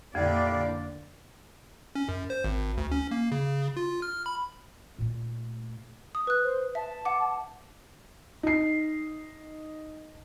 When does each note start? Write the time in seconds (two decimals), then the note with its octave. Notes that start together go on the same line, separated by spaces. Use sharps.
0.15 F2 A#2 D3 D4 E4 G4 D5 F5
1.95 C#4
2.09 F#2
2.30 C5
2.44 G#1
2.78 D2
2.92 C#4
3.11 A#3
3.32 C#3
3.77 F4
4.02 F6
4.26 B5
4.98 A#2 A3
6.15 D#6
6.27 B4 F#6
6.44 C5
6.75 E5 A5
7.05 F#5 D6
8.43 D#4 C7